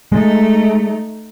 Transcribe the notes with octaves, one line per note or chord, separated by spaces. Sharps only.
G#3 A3 D#4